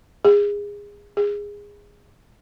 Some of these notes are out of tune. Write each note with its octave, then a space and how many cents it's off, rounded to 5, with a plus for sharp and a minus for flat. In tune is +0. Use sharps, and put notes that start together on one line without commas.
G#4 -25
G#4 -20